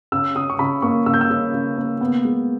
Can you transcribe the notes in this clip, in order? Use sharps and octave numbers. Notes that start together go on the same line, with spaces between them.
C#3 E6
C#3 D#6
C#6
C#3 B5
A#3 C#6
C#3 E6
G6
E6
C#3
C#3
A#3
B3
G#3